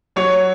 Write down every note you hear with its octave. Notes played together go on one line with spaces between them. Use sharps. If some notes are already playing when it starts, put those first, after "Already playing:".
F#3 C#5